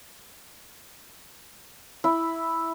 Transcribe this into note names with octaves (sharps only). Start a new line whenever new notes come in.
E4